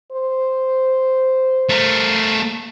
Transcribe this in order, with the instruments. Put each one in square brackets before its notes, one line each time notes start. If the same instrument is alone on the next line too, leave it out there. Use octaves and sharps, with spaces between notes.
[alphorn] C5
[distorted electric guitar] A3 A#4